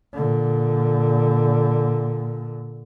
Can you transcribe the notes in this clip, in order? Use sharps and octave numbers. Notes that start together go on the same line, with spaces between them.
A#2 D3